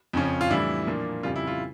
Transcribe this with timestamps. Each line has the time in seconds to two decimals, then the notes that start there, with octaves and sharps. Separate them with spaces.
0.13 F2 C#3 F3 C#4
0.41 F4
0.50 A2 E3 G3 D4 E4
0.87 A#2 F3 A#3 D4
1.23 F2 C#3 G3 F4
1.36 E4
1.47 F4